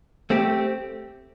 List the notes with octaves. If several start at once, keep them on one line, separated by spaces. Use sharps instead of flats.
A3 C4 G4